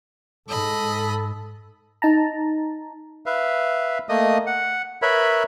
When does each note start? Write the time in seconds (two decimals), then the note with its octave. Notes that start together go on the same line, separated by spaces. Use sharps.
0.49 G#2 A4 D#5 B5
2.02 D#4 A5 A#5
3.26 B4 E5 F5
4.09 A3 A#3 D#5 D#6
4.47 F#5
5.02 A#4 B4 C#5 E5 B5